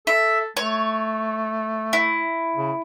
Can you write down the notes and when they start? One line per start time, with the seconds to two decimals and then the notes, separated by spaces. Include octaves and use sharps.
0.07 A4 E5
0.57 A3 C#5
1.93 E4
2.56 C#3